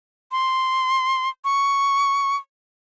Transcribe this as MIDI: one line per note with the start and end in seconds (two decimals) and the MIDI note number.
0.32 1.29 84
1.45 2.36 85